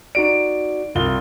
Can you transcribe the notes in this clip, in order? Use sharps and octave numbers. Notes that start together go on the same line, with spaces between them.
D#4 F#4 D5 D7
C2 F4 G7